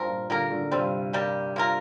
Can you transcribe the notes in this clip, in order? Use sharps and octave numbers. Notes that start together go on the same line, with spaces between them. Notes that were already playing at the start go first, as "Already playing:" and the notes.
Already playing: G2 F3 C4 A#4
A#2
A#2 D3 A#3 G4 A#4
A#2 D3
A#2
G2 C3 G3 C4 F4
G3 A#3 G4
A#3 F4 A#4